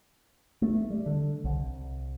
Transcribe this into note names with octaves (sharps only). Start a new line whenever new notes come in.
A3
G3
D3
C2